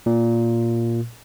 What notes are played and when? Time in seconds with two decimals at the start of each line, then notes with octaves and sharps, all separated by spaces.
0.06 A#2